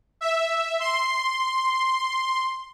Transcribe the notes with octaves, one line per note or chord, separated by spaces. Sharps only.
E5
C6